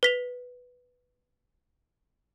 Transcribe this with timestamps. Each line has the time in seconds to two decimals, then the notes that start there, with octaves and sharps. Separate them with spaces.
0.03 B4 B6 F7